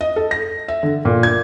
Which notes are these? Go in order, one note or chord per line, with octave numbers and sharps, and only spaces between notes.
D#5
A4
A#6
E5
D3
A#2
G#6